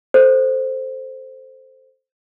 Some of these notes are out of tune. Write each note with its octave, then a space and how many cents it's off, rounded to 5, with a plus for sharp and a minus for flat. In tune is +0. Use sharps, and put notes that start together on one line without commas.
A4 +0 C5 +0